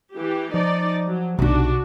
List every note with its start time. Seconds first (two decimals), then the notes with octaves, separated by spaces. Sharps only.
0.14 E3 G4
0.54 F3 D#4 D5
1.07 F#3
1.39 B1 C3 D4 D#4 F#4